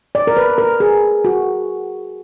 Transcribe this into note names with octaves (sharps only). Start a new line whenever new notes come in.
D5
A#4
B4
A#4
G#4
F#4